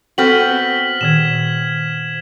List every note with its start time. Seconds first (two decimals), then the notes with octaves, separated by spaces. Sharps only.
0.18 B3 C4 F#4 A4 F6 B6 F#7
1.01 A#2 D#3 G#6 E7